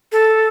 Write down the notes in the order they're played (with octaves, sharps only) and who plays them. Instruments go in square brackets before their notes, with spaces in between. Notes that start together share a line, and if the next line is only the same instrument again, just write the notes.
[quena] A4